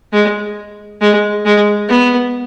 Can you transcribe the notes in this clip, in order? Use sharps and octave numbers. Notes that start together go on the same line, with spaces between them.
G#3
G#3
G#3
B3